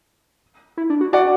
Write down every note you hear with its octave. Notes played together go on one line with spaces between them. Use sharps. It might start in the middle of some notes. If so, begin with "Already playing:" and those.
E4
D4
F#4
F#4 D5 F#5